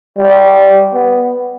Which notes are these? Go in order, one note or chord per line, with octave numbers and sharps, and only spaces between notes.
G3
B3